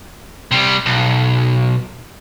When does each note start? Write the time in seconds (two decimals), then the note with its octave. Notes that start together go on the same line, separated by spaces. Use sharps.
0.51 C3 G3
0.86 B1